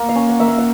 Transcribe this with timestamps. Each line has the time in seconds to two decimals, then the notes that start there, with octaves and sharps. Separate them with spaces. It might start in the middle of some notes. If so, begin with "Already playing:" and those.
Already playing: A#3
0.09 F5
0.15 C#4
0.29 F#5
0.40 A#3 E5
0.48 F5
0.58 F#5